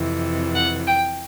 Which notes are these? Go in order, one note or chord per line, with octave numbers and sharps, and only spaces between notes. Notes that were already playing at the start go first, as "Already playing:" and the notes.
Already playing: F2 C3 E3
F#5
G5